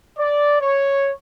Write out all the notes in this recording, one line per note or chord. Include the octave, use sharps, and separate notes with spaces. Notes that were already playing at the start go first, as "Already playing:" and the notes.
D5
C#5